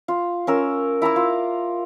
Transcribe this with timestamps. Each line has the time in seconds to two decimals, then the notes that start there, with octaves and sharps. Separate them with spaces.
0.08 F4
0.47 C#4 A#4 E6
1.02 E4 A#5 D6 E6
1.16 F4